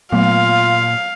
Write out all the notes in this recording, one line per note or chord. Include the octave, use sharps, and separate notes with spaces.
A#2 F#3 A3 B3 F4 F5